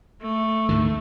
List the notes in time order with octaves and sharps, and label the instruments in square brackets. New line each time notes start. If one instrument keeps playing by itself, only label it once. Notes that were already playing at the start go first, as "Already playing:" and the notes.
[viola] A3
[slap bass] D2 G#2 D#3